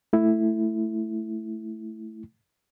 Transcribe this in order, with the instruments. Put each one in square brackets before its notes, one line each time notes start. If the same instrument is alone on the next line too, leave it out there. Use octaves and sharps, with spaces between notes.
[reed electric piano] A3 E4